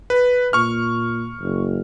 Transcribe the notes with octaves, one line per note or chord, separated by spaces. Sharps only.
B4
A#2 C#6 F6
F#1